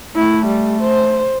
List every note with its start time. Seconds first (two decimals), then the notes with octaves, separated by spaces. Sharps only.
0.15 A3 E4
0.47 G3
0.82 C5